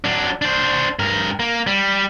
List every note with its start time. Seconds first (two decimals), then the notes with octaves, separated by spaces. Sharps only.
0.04 F#3 D4
0.42 D4 C5
0.99 G2 A#4
1.39 A#3
1.67 G3